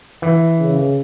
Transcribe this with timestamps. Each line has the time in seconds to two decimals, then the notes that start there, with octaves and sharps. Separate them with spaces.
0.22 E3
0.59 C#3